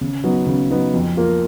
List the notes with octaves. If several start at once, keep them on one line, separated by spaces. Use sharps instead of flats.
C#3
F#3 B3 D#4
C#3
F#3 B3 D#4
F2
F3 A#3 F4